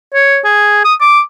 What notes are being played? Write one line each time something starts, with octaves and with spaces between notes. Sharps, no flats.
C#5
G#4
D#6
D6